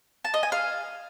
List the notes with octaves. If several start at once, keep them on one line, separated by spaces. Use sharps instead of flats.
A5
D#5
G#5
F5